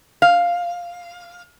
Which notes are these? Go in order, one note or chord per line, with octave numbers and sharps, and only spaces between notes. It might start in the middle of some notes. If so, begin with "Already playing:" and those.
F5